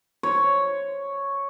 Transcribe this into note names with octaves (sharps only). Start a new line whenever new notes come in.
C#5